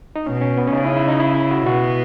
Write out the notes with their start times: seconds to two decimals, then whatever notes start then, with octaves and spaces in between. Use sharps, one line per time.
0.16 D#4
0.26 B2 C#4
0.41 C#4
0.57 B3
0.67 C#4
0.73 C#3 D#4
0.85 E4
0.96 E4
1.08 D#4
1.20 E4
1.35 E4
1.51 F#4
1.67 B2 B3 F#4